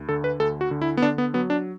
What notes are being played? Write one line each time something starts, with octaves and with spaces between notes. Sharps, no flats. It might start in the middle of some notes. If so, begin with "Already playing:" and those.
Already playing: D2
D3 A4
B4
D2 A4
F#4
D3
E4
B3
D3 D4
B3
F#3 B3
D4